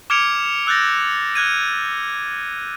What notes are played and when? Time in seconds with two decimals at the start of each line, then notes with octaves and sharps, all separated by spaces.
0.10 D6 F6 G#6 C#7 D7 F7
0.67 E6 F#6 G6 A6 A#6
1.35 F6 F#6 G#6 D#7